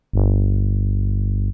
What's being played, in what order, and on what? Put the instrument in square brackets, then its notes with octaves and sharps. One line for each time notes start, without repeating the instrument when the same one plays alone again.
[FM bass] G1